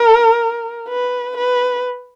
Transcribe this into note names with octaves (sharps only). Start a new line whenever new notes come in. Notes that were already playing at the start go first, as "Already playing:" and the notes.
Already playing: A#4
B4
B4